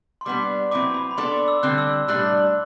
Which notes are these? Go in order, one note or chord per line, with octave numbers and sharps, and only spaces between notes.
C6
G3 B3 D4 D6
F#3 C4 E4 B4 D6
B5
B5
B3 D4 A4 D5 C6
D6
E6
D3 G3 C4 F#6
E6
E6
A2 G3 D4 F#6